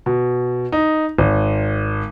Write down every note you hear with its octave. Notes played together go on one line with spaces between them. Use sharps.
B2
D#4
G#1